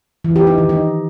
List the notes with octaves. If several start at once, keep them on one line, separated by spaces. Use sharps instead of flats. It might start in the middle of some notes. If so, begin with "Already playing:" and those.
E3
G4
D#4
D#3
D#4